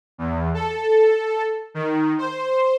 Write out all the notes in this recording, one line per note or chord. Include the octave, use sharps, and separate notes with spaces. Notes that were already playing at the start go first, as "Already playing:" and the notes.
E2
A4
D#3
C5